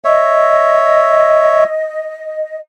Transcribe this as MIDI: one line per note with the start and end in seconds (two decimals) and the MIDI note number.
0.05 1.64 73
0.05 2.57 75
0.05 1.64 76